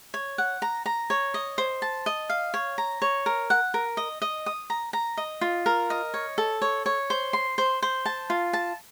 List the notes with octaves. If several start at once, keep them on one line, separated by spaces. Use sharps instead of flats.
C#5
F#5
A#5
A#5
C#5
D#5
C5
A5
D#5
F5
C#5
A#5
C#5
A#4
F#5
A#4
D#5
D#5
D#6
A#5
A#5
D#5
F4
A#4
D#5
C#5
A4
C#5
C#5
C5
C6
C5
C5
A5
F4
A5